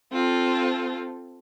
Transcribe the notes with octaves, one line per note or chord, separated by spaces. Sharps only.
C4 F4 A4